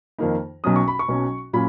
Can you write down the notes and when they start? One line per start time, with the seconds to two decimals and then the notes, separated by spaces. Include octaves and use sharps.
0.18 F2 D#3 A#3 D#4
0.64 B1 B2 F#3 C#4 D#6
0.76 C#6
0.88 B5
0.99 C#6
1.08 B1 B2 F#3 C#4
1.53 A#2 F#3 C#4 B5